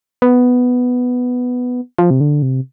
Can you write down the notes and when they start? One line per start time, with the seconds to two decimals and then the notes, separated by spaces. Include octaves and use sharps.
0.22 B3
1.99 F3
2.10 C3
2.21 D3
2.42 C3